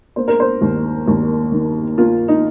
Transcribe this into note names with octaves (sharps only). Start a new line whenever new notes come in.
A#3 C5
A#4
C5
D#2
D#2
D#3
A#3 F4
D#4